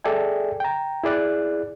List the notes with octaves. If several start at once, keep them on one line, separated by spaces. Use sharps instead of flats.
G#4 A4 D5 E5 G5 G#5
G5 A#5
E4 G#4 D5 F#6